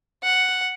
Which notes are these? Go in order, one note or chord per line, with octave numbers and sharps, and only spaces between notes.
F#5